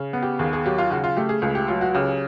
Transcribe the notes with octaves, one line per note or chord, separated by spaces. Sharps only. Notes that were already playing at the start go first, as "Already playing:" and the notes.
Already playing: C#3
B3
G4
D#2 G#4
G#4
F#3 G4
F4
C#3 F#4
F4
A3 G4
G#4
C#2 G#4
G4
F#3 F4
F#4
C#3 G4